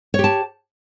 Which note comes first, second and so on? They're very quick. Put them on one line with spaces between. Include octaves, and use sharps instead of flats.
C#5 G4 A5